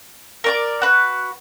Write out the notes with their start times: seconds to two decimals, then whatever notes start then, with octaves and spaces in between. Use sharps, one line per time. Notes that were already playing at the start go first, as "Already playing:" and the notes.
0.44 A#4 D5 D6
0.82 F#4 B4